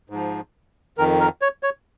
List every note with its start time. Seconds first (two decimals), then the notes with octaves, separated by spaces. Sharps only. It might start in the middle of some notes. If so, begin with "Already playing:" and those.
0.10 G#2 F3
0.98 F2 D#3 A#4
1.20 A#4
1.42 C#5
1.63 C#5